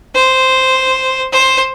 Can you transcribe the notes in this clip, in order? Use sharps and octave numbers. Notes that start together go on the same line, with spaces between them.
C5
C5